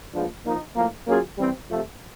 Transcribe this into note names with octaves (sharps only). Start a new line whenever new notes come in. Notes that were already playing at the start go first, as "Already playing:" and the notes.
A#2 F3 G#3 B3 D4
F3 A#3 D#4
A2 F3 A#3
F#3 A#3 C#4 F4 G#4
E3 G3 C4
C3 F3 A3